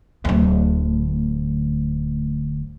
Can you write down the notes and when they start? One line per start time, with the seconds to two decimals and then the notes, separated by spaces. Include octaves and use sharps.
0.25 D1 D2